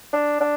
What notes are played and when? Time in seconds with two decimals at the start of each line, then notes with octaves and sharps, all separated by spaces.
0.13 D4
0.40 D4